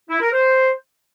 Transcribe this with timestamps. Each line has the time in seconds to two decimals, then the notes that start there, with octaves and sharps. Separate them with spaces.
0.10 E4
0.21 A#4
0.33 C5